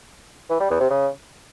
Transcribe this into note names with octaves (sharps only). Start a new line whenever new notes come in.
E3
G3
E2
C3
C#3